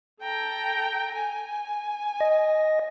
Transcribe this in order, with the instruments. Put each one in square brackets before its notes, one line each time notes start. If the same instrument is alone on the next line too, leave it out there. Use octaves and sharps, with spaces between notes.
[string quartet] A4 G5 A#5
G#5
[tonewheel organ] D#5